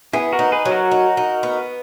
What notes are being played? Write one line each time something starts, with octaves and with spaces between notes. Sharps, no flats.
B3 E4 G#4
F#4 A#4
D#4
G#4 B4
F#3
F#4 A#4
D#4
D#4
B3